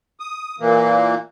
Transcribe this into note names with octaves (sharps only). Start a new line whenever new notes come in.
D#6
A#2 E3 A#3